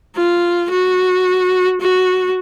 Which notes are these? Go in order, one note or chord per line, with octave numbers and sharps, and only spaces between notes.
F4
F#4
F#4